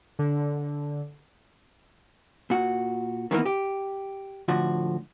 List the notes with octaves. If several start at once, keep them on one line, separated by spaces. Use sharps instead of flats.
D3
A#2 F#4
D#3 E3 G#3 A#3 B3
G4
A2 D3 F3 F#4